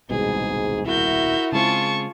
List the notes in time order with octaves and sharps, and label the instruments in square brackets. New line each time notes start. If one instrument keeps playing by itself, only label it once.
[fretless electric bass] D#1 C2 B2 [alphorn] G#2 [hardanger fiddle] G#4
[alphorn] E4 [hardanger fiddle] F#4 A#4 [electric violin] E5 G6
[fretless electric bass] C#3 G#3 C4 [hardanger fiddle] F4 G#4 [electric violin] A5 C#6